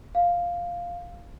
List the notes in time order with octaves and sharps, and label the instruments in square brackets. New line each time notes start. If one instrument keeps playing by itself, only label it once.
[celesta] F5